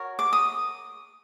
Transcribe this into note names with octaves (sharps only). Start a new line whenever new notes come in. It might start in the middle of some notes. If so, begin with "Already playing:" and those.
Already playing: F#4 A#4 C#5
D6
D#6